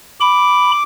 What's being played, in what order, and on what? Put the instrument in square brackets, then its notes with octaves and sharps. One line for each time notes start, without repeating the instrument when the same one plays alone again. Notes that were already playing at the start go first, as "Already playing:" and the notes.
[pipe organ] B5 [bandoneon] D6